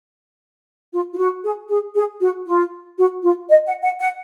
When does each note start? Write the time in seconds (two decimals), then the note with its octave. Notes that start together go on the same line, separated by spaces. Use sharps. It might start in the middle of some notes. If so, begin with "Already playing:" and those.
0.90 F4
1.12 F4
1.17 F#4
1.42 G#4
1.68 G#4
1.93 G#4
2.19 F#4
2.45 F4
2.96 F#4
3.22 F4
3.48 D#5
3.65 F#5
3.81 F#5
3.99 F#5